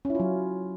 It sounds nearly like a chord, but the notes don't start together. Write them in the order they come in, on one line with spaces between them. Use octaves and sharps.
C#4 E4 F4 F#3